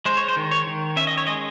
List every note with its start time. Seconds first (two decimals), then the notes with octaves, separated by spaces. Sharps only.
0.05 G#3 C5
0.17 C#5
0.28 C5
0.37 D#3
0.51 C#5
0.66 D#3
0.96 C#4 E5
1.07 D#5
1.17 C#5
1.27 G#3 D#5